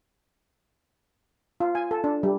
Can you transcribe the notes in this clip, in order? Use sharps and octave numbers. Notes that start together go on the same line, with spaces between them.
F4
G#5
A4
D4
G3